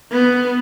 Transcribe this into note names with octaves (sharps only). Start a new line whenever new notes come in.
B3